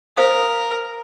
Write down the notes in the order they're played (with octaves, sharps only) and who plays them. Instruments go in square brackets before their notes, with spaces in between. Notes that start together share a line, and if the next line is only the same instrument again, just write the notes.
[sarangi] A#4 [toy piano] C5 F5 D#6